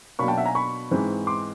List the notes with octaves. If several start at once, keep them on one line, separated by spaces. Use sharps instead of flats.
B2 F#3 A#3 D4 B5 C#6
G5 A5
E5 F#5
G#5 A#5
B5 C#6
G#2 E3 G#3 C4
C6 D6